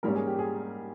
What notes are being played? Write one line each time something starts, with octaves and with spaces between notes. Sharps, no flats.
G#2 G3 A#3 C#4 A#4
G#4
G4
G#4